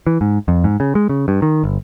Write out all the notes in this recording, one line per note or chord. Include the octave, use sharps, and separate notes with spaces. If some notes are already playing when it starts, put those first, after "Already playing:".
E3
G#2
F2
G#2
C#3
G#3
C#3
G2
D#3
G1